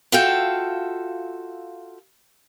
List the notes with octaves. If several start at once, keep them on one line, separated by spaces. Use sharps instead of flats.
F4 F#4 A4 E5 F5 G5